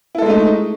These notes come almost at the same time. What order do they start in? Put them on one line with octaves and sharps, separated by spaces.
E4 A4 G#3 A3 D#4